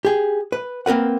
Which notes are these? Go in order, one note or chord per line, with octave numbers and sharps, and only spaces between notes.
G4 G#4
B4
A#3 C4 A#4 B4 F#5